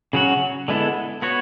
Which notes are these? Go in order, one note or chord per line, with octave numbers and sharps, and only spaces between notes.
C#3 F#3 C#4 F#4
D3 G#3 B3 E4 A4
B3 F#4 C#5